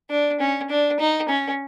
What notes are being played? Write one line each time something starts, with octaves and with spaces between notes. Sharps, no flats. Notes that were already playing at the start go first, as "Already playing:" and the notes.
D4
C#4
D4
D#4
C#4